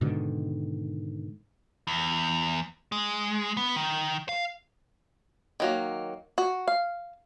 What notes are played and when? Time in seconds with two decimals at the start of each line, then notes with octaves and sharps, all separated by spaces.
0.01 G#2 B2 D3 D#3
1.87 E2
2.92 G#3
3.57 B3
3.76 D#3
4.29 F5
5.60 D#3 F#3 A#3
6.38 F#4
6.68 F5